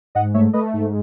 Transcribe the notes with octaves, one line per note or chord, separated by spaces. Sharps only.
G#2 D#5 F#5
A3 C#5 E5
A3 B4 D#5
G#2